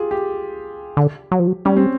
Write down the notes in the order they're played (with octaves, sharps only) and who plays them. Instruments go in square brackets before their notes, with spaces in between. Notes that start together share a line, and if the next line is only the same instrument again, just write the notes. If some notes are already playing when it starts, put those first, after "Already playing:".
Already playing: [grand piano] F4 G4 G#4
G4
[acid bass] D3
F#3
F3
F#3
[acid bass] G3 [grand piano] C#4
[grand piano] C4